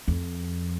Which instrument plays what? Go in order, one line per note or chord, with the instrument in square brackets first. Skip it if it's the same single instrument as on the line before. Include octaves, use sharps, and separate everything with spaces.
[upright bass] F2